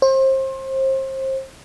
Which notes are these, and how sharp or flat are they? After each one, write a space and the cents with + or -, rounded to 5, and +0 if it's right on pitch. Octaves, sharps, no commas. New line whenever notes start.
C5 +30